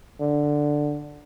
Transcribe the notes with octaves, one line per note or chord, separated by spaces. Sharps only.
D3